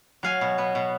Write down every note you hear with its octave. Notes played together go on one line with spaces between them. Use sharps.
F#3 F5 G#5
B2
B3
B2